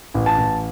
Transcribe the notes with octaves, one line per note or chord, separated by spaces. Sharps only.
A1
A5
A1